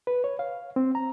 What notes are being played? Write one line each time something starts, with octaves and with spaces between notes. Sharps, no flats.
B4
C#5
F5
C4
A#5